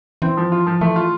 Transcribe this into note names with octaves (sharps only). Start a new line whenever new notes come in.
E3 C4
F3
F4
F3
E3 A3
F4